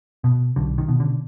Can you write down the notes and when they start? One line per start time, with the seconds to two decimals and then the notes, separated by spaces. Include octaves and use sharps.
0.24 B2
0.56 B1 D3
0.78 D#3
0.88 B2
1.00 D3